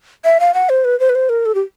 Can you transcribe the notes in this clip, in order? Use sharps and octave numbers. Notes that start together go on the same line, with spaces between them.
E5
F5
F#5
C5
B4
C5
B4
C5
A#4
A4
G4